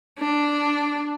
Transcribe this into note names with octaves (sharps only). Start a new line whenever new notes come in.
D4